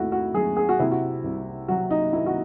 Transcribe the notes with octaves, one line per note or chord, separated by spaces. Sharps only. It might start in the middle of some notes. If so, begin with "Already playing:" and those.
Already playing: D#2 D#3 A3 E4 F#4
F#4
F#3 G#4
G#4
F#4
C3 E4
F#4
C2
F#3 F#4
D#4
D#3 E4
F#4